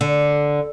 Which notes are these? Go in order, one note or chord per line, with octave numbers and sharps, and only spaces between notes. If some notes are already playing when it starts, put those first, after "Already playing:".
D3